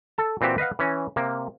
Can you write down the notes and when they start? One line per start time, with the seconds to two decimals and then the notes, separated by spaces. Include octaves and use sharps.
0.18 A4 A5
0.41 A#2 E3 C4 F#4 G4
0.58 B4 D#5 F5 F#5
0.79 E3 C#4
1.16 C3 A#3